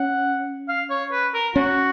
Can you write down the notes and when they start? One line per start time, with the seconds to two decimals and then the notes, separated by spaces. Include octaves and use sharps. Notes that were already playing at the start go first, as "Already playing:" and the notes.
Already playing: C#4 F#5
0.69 F5
0.90 C#5
1.12 B4
1.34 A#4
1.55 C#4 F#4